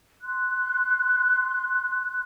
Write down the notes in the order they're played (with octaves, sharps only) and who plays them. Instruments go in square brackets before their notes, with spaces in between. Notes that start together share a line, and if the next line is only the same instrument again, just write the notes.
[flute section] C6 F#6